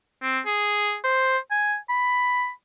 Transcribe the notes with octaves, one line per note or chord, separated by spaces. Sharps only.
C4
G#4
C5
G#5
B5